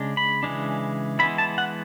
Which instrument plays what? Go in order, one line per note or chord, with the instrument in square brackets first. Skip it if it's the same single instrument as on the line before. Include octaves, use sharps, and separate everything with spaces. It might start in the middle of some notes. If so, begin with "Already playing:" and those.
Already playing: [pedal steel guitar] C#3 G#3 D4
B5
C#3 E3 G#3 D4
E3 G#3 B3 E4 B5
A5
F#5